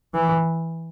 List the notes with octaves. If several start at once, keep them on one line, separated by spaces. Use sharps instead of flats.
E3